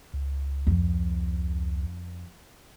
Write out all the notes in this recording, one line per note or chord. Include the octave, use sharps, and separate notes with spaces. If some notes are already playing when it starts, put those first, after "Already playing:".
C#2
F2